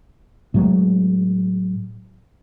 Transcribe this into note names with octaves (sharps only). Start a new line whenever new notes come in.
A2 F#3 G#3